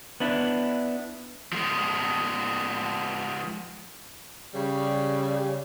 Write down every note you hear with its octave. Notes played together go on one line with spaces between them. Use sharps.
B3 D4 E4
F3 G#3
C#3 G3